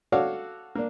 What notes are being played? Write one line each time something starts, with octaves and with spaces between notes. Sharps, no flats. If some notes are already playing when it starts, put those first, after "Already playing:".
F#4 A4 C#5 D5 F5 F#5
A#3 D4